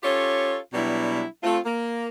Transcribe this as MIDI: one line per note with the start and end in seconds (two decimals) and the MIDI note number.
0.04 0.57 61
0.04 0.57 65
0.04 0.57 67
0.04 0.57 69
0.04 0.57 73
0.73 1.24 47
0.73 1.24 54
0.73 1.24 55
0.73 1.24 59
0.73 1.24 62
0.73 1.24 64
1.43 1.59 57
1.43 1.59 60
1.43 1.59 65
1.65 2.09 58